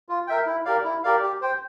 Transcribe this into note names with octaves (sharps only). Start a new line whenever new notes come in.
F4
A#4 E5 G5
E4
G4 A#4 D5 F5
E4
G4 A#4 D5 F5
G4
C5 G5